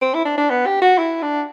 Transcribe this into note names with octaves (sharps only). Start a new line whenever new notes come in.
C4
E4
D4
D4
B3
G4
F#4
E4
D4